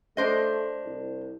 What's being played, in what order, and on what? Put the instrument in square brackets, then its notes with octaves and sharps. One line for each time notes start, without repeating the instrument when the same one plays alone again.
[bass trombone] A3 [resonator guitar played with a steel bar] D4 C5 D#5
[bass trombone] C2